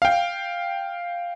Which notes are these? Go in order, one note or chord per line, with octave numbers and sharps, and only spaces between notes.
F5 G5